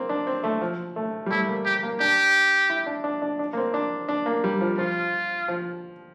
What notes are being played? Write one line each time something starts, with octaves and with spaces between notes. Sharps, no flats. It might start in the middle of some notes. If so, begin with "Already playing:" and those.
Already playing: A#3 C4
D4
C4
A3
F3
A3
G3
A3 E4
A#3
G4
A#3
D4 G4
E4
D4
D4
D4
D4
A#3
C4
D4
D4
A#3
G3
F3
F3 F4
F3